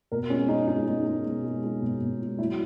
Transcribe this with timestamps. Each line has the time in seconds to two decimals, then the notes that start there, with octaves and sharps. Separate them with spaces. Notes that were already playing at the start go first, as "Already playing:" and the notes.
0.12 B2 A#4
0.30 G#3 C#4
0.48 G#3 D#4
0.68 G#3 D#4
0.87 G#3
1.06 G#3
1.25 B2
1.44 G#3
1.64 G#3
1.82 B2
2.01 B2
2.20 G#3
2.39 F#3 E4